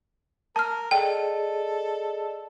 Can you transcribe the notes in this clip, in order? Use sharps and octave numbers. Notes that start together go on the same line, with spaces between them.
A#4 A5 F6
G#4 A4 D5 D#5 G5